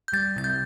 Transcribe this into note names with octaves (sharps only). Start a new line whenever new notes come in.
G6
G3 A6
C3 A6
G6